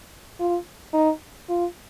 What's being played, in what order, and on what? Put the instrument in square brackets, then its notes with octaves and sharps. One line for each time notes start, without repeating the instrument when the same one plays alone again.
[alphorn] F4
D#4
F4